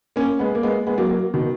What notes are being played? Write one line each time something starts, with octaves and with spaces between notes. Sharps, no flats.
A#3 C#4
G#3 B3
A#3
G#3 B3
G#3 B3
F#3 A#3
F#3 A#3
B2 D#3